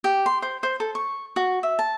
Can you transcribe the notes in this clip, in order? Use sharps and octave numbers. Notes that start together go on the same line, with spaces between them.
G4
C6
C5
C5
A4
C#6
F#4
E5
A5